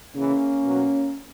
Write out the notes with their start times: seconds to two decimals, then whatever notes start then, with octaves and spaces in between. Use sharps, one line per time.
0.15 C#3 E3 A#3 C#4
0.63 B2 F#3